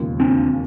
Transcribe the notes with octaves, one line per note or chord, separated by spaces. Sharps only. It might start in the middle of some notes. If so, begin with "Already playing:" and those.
Already playing: E1 D#2 C#3 F3 A#3
C4 D4